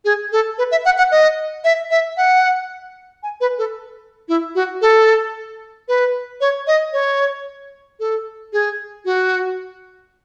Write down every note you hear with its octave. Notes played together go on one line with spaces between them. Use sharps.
G#4
A4
B4
E5
F#5
F#5
D#5
E5
E5
F#5
G#5
B4
A4
E4
F#4
A4
B4
C#5
D#5
C#5
A4
G#4
F#4